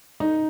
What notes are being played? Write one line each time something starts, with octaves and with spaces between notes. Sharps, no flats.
D#4